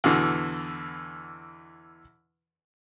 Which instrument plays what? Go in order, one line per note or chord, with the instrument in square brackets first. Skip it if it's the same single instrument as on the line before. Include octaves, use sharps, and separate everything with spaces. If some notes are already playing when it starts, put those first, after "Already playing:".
[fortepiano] E2 B2 D3 E3